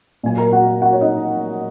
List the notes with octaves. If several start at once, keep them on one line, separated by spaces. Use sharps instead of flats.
A#2 F#3 G#5
A#4 A#5
F#4 F#5
F#4 F#5
C#5
D#4 D#5